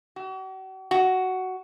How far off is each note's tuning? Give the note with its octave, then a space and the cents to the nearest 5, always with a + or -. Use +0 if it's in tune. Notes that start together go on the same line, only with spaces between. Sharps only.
F#4 +45
F#4 +10